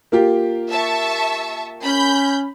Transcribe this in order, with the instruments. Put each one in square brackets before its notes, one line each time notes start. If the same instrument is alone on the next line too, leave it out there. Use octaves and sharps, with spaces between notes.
[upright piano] A#3 F4 G4
[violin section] E5 A5 C#6
[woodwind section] C#4 [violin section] B5 G6